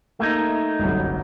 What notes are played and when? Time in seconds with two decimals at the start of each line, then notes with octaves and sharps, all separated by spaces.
0.20 A3 A#3 D#4 G#6
0.79 G1 C2 F#2